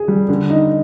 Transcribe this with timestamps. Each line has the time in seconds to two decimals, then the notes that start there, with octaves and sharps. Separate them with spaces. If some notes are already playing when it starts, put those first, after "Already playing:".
Already playing: G#4
0.08 G3
0.29 D3
0.50 D#4